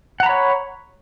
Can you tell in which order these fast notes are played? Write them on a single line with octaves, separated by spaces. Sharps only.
F#5 A#5 B5 C#5